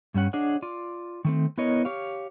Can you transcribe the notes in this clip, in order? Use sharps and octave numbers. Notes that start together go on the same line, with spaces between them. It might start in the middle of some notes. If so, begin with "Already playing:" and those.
G2 G3 C#4 F#5
D4 G#4 C#5 D#5 F#5
F4 D5
D#3 A3 C4
B3 E4 A#4 C#5 D#5
G4 C#5 F5